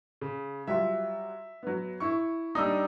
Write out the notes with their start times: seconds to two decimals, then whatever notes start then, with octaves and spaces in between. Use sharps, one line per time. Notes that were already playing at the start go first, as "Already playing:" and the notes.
0.21 C#3
0.67 F#3 G3 F4 E5
1.63 F#3 B3
2.00 E4 C#6
2.55 G3 D4 D#4 D#6 E6